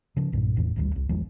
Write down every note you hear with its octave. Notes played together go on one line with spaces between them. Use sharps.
C#3 F3
B1 G2 A#2
F#1 E2 A2 E3
G#1 D2 D3 G3
C2
G#1 E2 F3 G#3